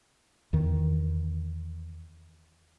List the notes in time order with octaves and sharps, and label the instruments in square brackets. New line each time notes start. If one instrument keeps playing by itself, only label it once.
[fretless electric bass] E2 D#3